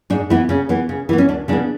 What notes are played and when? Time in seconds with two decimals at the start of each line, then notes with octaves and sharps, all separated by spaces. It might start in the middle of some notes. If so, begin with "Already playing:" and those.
0.10 G#2 D4
0.30 E3 B3 E4
0.49 C#3 C#4
0.69 E3 B3
0.89 C#3
1.09 E3 B3
1.18 C#4
1.29 D2 D4
1.48 C#3 E3 B3 D4